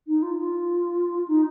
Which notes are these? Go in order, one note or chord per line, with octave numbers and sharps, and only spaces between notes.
D#4
F4
F4
D#4